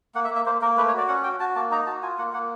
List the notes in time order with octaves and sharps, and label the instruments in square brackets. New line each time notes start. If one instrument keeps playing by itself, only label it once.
[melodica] A#3 F#5
E5
A#3
E5
A#3 C5
A#3 A#4
A3 B4
C#5
F#4 D5
C#4 F#5
F#4 G5
F#4 A5
A#3 A5
D#4 A#5
F#4 A5
F4 G#5
A#3 F#5
A#3 F#5